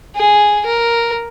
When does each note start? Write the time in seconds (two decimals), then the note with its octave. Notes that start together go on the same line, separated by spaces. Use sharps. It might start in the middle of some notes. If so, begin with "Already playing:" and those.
0.16 G#4
0.66 A#4